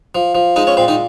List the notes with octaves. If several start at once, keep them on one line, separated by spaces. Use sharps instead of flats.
F3
F3
G#3 D#4 D#5
C#4 C#5
A#2 C4 C5
D#3 D#4